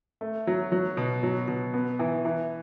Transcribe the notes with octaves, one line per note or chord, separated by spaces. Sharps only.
A3
F#3
F#3
B2
F#3
B2
B3
E3
E3